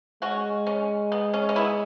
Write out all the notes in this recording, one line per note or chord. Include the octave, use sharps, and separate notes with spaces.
G#3 C#4 F#4
C#4
B3
C#4
C#4
B3 E4